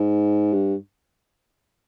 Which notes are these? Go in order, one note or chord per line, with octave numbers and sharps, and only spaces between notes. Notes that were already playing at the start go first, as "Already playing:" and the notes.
Already playing: G#2
G2